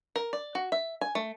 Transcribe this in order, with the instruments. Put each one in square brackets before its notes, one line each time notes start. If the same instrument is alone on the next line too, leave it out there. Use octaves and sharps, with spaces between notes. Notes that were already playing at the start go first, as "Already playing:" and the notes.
[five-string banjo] A#4
D5
F#4
E5
G#5
A3